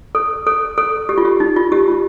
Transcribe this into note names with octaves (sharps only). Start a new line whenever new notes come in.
A4
A4
A4
G4
F4
G4
D#4
F4
G4
F4